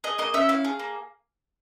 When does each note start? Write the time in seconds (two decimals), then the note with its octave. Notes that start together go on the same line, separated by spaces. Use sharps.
0.04 G#4 D#5
0.18 A#3 D#5
0.34 C#4 E5
0.49 E4 F5
0.65 G#4
0.80 A#3